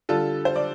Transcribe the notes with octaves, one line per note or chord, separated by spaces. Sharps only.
D3 G3 F4 A4
C5
D5